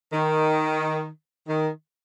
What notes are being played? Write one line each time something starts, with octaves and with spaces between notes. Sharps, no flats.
D#3
D#3